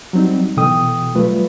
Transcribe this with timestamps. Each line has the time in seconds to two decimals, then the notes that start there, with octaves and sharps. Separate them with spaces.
0.13 F#3 G3 C4 D#4
0.57 B2 E3 A4 G5 D#6
1.14 F#3 G3 A3 F4 B4